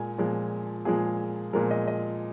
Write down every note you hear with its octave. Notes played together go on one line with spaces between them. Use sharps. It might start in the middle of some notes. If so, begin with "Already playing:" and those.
Already playing: A#2 G#3 G#5
A#2 F3 G#3
A#2 F3 G#3 G#4
A#2 F3 G#3 A#4
D#5
D#5